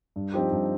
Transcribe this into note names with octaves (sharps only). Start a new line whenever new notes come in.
G2
F3 C4 D#4 G4
G2